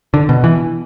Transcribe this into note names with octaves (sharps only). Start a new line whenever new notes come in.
D3
B2
E3